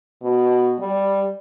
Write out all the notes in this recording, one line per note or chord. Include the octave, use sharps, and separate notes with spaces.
B2
G3